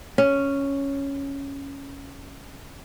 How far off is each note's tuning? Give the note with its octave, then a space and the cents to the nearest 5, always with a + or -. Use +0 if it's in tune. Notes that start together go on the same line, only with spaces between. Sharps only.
C#4 +0